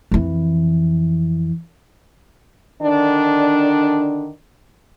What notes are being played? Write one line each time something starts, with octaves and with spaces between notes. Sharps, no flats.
F2 E3
D3 D#3 D4